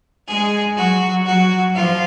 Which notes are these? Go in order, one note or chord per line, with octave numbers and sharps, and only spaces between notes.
G#3 G#4
F#3 F#4
F#3 F#4
F3 F4